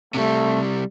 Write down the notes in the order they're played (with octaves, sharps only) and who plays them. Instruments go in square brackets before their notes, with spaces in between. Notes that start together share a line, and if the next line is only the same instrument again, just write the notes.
[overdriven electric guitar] C3 G3 [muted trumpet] A3